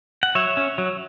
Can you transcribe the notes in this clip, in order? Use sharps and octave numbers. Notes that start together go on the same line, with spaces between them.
F#5
F#3 C#5 E5
C#4
F#3